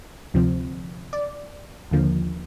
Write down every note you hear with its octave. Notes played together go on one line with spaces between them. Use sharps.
D2 C3 F3 C4
D5
D#2 D3 F3 A#3